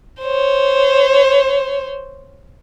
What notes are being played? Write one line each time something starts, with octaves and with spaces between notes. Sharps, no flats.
C5 C#5